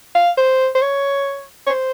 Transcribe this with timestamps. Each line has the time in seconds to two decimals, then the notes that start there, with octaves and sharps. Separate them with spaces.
0.15 F5
0.37 C5
0.75 C5
0.82 C#5
1.67 C#5
1.70 C5